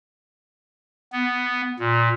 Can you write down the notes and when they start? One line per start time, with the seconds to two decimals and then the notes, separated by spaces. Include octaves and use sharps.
1.13 B3
1.79 A#2